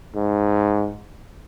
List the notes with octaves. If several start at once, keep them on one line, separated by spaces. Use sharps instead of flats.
G#2